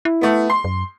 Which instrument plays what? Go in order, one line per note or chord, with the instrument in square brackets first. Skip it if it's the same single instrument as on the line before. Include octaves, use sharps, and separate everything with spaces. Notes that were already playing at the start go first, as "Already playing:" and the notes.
[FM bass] E4
[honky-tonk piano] A3 B3
C6
[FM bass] F#2